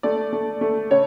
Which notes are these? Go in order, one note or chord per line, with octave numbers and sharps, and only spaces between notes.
A3 D5
A3
A3
C#3 C#5